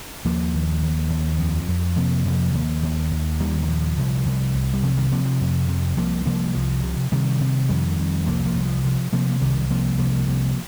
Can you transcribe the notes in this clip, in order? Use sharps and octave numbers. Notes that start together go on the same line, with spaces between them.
D#2 F3 A#3
D#2
D#2
D#2
F2 F3
F2
C3 F3 A#3
F2
D#2
D#2
D#2
D#2 D#3 G3
D#3
A#2 F3
C2
C2
C2
G3
C3 F3
D#3 G3
C3 F3 A#3
F3
F2
C3
C2 F3 A#3
C2 F3 A#3
C2 F3
C3
C3 D#3 G3
C3
F2 D#3 G3
F2
C2 F3 A#3
F3 A#3
C2
F3
C3 F3
C3 F3 A#3
A#3
C2 D#3 G3
C3 F3 A#3
C2 F3 A#3
C3